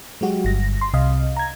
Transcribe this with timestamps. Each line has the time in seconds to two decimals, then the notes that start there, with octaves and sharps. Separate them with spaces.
0.21 F#3 G#3 F#4 G4
0.45 G1 G2 A#6
0.81 C6
0.94 C2 C3 D#5 F5
1.37 A#5 G#6